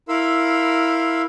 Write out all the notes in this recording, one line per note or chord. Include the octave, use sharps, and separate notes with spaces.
E4 A#4 F5 B5 C6 E6